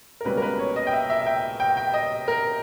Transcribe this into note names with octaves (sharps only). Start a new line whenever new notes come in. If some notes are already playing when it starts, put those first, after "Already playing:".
A#4
C#2 B2 G3 A#3 C#4 B4
A#4
B4
C#5
D#5
G5
E5
E5
E5
G5
G5
G5
D#5
A#4